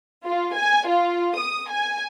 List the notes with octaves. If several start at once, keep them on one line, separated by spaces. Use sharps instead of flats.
F4
G#5
F4
D#6
G#5